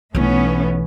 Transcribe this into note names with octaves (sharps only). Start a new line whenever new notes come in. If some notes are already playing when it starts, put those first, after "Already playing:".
B1 E3 A3 B3 C#4